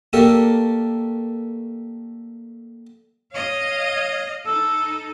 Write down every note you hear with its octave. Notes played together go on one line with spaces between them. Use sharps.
A3 A#3 D4 G4 A4 A#4
C#5 D#5 F5
D#4 A4 E6